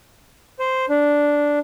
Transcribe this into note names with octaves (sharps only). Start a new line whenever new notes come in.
C5
D4